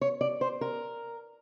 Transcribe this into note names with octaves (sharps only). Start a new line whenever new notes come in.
C#5
D5
C5
A#4